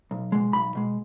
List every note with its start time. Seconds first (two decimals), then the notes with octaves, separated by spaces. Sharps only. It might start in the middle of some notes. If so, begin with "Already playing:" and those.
0.11 B1
0.32 B2 G#3
0.53 B1 B5
0.75 B2 G#3